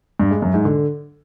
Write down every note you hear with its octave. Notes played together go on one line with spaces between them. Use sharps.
G2
G#3
F#2
G#2
D3